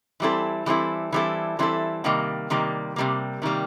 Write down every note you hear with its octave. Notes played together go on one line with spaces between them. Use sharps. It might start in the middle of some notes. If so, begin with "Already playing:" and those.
E3 G3 C4 E4 A4
E3 G3 C4 E4 A4
E3 G3 C4 E4 A4
E3 G3 C4 E4 A4
C3 D#3 G3 A#3
C3 D#3 G3 A#3
C3 D#3 G3 A#3
C3 D#3 G3 A#3